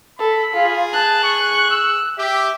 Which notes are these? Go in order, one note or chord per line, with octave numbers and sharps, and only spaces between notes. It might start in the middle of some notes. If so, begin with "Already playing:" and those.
A4 B5
F4 G#4
A5 F#6
C#6
E6
G4 E5